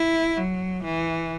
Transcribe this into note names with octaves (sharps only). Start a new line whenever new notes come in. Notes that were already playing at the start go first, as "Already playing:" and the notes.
Already playing: E4
F#3
E3